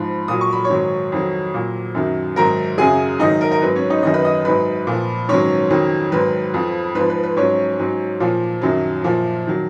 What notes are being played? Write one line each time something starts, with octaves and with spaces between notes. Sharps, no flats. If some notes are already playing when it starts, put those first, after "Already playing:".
Already playing: G#2 F3 B5
A#2 F#3 D#6
C#6
B5
C#5 C#6
G#2 D#3 F#3
F2 D#3 F#3
A#2 F#3
F#2 D#3 F#3
G#2 D#3 F#3 A#4 A#5
F#2 C#3 F#3 G#4 G#5
G#2 D#3 F#3 D#4 D#5
A#4
A#4
G#2 F#3 B4
C#4 C#5
D#4 D#5
F#2 D#3 F#3 D#4 D#5
B4 B5
D#5 D#6
G#2 F#3 B4 B5
A#2 F3
G#2 D#3 F#3 C#4 C#5
F2 D#3 F#3
G#2 D#3 F#3 B4
F2 F3
G#2 F3 B4
B4
B4
G#2 F#3 C#4 C#5
G#2 F#3
A#2 F3
F#2 D#3 F#3
A#2 F3
D#3 F#3